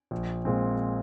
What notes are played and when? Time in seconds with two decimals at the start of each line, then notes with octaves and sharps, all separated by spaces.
0.11 A#1
0.45 A#2 G#3 C4